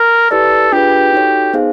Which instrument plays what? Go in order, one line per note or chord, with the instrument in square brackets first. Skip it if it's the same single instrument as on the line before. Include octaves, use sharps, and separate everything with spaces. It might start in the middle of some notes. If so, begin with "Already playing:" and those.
Already playing: [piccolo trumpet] A#4
[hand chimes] E4 G4 B4 D5 [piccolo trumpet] A4
[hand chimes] D4 F4 G#4 B4 [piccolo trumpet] G4
[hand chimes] D#4 F#4 A4 C#5
B3 D#4 G#4 C5 F5